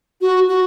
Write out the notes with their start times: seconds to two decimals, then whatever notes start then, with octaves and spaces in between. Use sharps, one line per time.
0.21 F#4
0.48 F#4